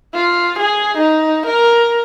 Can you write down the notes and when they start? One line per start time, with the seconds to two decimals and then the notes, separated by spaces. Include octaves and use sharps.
0.14 F4
0.59 G#4
0.98 D#4
1.47 A#4